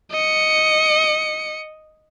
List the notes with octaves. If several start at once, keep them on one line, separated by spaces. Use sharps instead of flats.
D#5 C#7